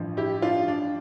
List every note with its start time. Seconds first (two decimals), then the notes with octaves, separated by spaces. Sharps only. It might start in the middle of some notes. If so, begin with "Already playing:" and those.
Already playing: A1 G2 F3
0.17 E4 G4
0.42 D4 F4
0.68 D4